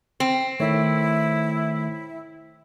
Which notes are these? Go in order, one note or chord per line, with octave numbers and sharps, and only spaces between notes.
C4
D#3 A3 E4 C#5